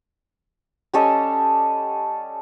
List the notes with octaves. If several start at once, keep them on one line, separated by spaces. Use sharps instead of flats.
G3 C#4 A4 D#5